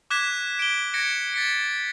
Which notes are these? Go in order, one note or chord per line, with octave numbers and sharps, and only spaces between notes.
D6 F#6 G#6 B6 E7
D7 G7
G#6 A#6 C#7 D7
A6 B6 C#7